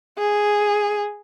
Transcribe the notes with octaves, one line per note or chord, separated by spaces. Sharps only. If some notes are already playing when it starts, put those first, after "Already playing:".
G#4